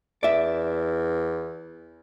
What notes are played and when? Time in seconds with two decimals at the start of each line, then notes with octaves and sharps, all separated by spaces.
0.23 E2 D5 E5